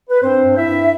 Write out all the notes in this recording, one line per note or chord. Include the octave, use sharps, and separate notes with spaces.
B4
G2 C4 C5
G2
E4 E5
G2